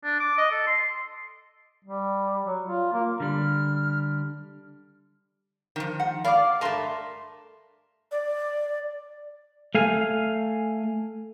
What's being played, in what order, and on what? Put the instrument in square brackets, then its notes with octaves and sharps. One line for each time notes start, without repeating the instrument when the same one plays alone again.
[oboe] D4
D6
D#5
A4
C6
[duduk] G3
F#3
F4
A#3
[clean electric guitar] D3 G3 [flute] F6
[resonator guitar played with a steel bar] D#3 F3
[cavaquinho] F#5
[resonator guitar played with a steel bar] D5 F5 [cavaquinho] B5 D6
[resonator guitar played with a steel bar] G2 A3 [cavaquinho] A#4 A5 C6
[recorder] D5
[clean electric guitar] A3 F5 G#5